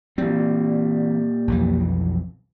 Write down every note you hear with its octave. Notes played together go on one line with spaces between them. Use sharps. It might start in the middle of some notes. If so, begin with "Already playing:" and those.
A#2 E3 G3 C4
B1 F2 E3